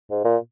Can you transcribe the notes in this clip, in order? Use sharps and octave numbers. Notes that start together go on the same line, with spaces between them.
G#2
A#2